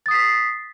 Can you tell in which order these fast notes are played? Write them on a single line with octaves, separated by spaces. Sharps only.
A6 D#6 C7 B6